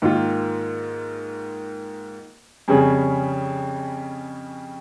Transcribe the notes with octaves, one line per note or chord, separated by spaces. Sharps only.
G#2 D#3 A#3 F4
F2 C#3 G3 C#4 G#4